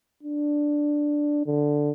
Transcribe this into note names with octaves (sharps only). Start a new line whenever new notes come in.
D4
D3